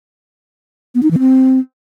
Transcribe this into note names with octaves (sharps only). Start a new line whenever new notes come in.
B3
D#4
E3
C4